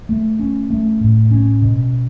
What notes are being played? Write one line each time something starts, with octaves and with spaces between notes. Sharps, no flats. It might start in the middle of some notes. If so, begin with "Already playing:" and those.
A3
C#4
A3
A2
C#4
B2